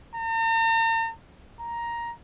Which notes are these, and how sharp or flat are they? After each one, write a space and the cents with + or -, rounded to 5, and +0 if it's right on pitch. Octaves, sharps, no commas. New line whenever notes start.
A#5 -45
A#5 +10